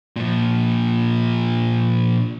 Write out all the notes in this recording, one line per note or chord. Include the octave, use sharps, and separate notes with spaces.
A#2 F3